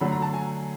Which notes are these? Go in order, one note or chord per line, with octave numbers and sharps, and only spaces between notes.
D3 F#3 A3 B5
A#5
A5
G#5